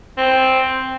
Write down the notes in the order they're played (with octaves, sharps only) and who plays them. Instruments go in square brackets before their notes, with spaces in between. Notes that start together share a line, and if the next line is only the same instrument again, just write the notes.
[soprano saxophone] C4